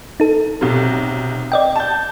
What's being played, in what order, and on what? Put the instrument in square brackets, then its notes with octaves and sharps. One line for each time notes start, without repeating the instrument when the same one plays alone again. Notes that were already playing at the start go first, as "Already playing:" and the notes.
[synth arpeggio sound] D#4 A4
[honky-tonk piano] B1 C3
[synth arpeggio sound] D5 D#5 G5
[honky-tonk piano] A5 G6